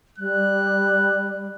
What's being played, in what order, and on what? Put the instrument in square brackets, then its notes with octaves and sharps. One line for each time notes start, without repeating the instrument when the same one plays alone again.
[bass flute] G3 [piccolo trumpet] F#6